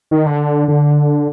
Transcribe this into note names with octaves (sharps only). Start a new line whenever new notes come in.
D#3
D3
D3